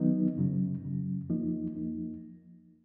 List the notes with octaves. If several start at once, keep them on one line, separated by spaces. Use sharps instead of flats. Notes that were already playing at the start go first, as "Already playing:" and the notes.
Already playing: D#3 F#3 B3 D#4
F#2 C#3 F#3
F#2 C#3 F#3
F2 F3 A#3 D#4
F2 F3 A#3 D#4